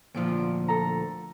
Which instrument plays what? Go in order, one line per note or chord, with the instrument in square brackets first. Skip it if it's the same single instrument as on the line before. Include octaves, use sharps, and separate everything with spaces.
[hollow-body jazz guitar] D2 A#2 F3 [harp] D7
[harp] A4 A#5